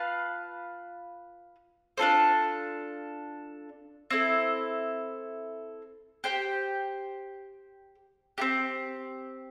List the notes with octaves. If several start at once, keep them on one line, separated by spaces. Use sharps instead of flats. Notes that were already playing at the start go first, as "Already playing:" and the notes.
Already playing: F4 B4 F5 A5
D4 F4 A4 C5
C4 E4 A4
G4 C5 G5
C4 E4 G4